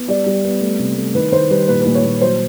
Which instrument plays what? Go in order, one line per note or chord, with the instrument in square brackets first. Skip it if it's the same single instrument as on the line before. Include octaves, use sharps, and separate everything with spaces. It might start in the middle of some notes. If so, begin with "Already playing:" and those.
Already playing: [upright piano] B3
G3 D5
G3
B3
A3
C3
A3
D#3 B4
D#3 C5
G3 B4
A#2 B4
A#2 B4
C#5
A#2
F#3 C5